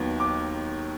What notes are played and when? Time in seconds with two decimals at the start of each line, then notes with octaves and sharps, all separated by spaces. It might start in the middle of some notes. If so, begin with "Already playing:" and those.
Already playing: D#2 D#3 F#3 B3
0.20 D6